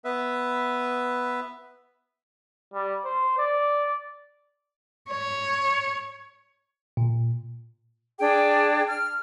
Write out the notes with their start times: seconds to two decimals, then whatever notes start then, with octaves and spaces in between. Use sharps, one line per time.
0.05 B3 B4 E5
2.73 G3
3.05 C5
3.38 D5
5.11 C#5
6.97 A#2
8.18 D4 G#4 G5
8.88 F6